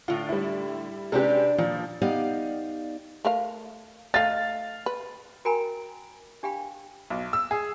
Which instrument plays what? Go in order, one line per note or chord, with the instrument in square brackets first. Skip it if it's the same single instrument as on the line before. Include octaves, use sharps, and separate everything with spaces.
[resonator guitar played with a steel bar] A2 D3 [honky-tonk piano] F4
[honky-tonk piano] G3 E4
[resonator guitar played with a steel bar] C3 D4 B4 [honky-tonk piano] G#3 C#4 G4
[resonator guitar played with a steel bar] A#2 [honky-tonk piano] F3
[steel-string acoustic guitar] B3 D#4 G4 D5 F5
[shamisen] A3 A#4 F5
[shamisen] A3 D#4 [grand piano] F5 A6
[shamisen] B4
[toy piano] F#4 A#4 G5 G#5 A#5 B5
D4 G4 F5 G5 B5
[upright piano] B1
E6
G#4